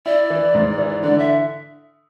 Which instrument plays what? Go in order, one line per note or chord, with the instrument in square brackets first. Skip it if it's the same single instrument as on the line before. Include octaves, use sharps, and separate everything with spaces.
[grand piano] E4 [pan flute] D5
[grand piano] E3
G#2
E3
[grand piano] D3 [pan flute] D5
[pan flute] E5